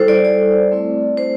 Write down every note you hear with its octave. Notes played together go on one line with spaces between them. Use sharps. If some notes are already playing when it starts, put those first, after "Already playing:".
Already playing: G3 E4 A4 C5
D5
D5
A3 C4 E4
C5